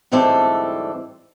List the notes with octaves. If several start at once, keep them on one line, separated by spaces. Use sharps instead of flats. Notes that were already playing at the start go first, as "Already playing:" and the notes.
D2 G#2 E3 G3 C4 A4